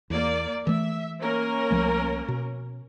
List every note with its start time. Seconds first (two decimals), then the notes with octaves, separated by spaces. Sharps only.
0.10 E2 A#3 D5
0.67 E3 A3 E5
1.21 A#3 C#4 A#4
1.71 C2 F3 A3
2.28 B2